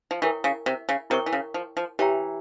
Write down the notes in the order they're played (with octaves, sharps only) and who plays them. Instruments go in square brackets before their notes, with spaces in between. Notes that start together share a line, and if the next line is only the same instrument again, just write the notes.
[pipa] F3
[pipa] E3 [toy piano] E4 A#4 C#5 G5 C#6
[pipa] C#3
C3
C#3
[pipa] C3 [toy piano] E4 A#4 C#5 G5 C#6
[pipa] E3
C#3
F3
F3
[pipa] E3 [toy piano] G4 C#5 E5 G5 A#5